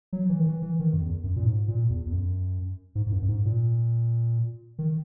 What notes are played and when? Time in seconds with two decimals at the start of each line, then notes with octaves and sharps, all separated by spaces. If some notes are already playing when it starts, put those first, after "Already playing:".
0.13 F#3
0.29 E3
0.40 D#3
0.46 E3
0.62 E3
0.80 D#3
0.93 F#2
1.01 E2
1.24 F#2
1.36 A#2
1.46 G#2
1.68 A#2
1.90 E2
2.07 E2
2.12 F#2
2.95 G#2
3.06 G#2
3.12 F#2
3.22 F#2
3.29 G#2
3.45 A#2
4.78 D#3